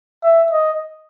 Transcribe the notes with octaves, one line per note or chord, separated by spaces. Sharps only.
E5
D#5